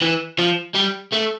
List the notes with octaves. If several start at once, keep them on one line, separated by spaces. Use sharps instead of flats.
E3
F3
G3
A3